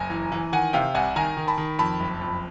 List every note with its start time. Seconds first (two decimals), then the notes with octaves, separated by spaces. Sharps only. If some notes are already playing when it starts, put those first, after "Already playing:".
Already playing: F#1 G#5 A#5
0.10 E3
0.32 E3
0.52 D#3 F#5 G#5
0.73 C3 F5 G5
0.94 C2 F#5 G#5
1.16 D#3 G#5 A#5
1.37 D#3
1.48 A5 B5
1.58 D#3
1.79 F2 A5 B5
2.00 F#1
2.21 F2